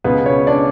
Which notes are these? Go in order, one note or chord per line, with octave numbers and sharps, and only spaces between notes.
C#2 B2 G#3 B3 B4
C#4 C#5
D4 D5